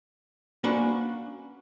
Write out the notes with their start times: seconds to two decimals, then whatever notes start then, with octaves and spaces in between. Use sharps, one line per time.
0.64 A#3 C#4 D4 F#4 B4 C5